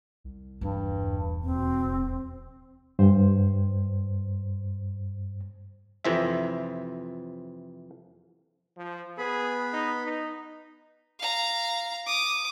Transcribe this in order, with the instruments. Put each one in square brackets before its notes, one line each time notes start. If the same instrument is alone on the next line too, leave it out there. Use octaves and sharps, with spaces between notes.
[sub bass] C2
[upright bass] D#1 E2 [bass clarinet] G2
[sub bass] D#2 [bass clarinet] B2 [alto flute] C4
[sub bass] D1
[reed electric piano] G2 C5
[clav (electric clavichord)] F2 C3 E3 C4 E5
[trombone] F3
[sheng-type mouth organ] B3 B5 [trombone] G#4
[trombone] D#4
D#4
[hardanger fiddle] F5 A#5
D6 D#6